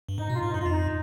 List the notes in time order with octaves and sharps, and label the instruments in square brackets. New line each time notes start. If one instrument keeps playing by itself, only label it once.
[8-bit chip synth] G2
[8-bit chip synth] G#2 [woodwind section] D#4
[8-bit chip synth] B2 [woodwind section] F4
[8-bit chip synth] G#2
[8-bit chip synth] G2 [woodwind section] D#4
[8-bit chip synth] G2 [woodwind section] F4
[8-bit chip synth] F2 [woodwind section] D#4